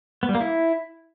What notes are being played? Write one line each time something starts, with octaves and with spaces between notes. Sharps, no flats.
B3
G3
A#3
E4